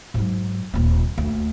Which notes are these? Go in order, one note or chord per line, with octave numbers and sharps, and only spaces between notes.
G#2 F#3
D#1 C4
D2